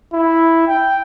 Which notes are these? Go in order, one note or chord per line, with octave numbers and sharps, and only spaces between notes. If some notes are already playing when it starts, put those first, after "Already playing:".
E4
G5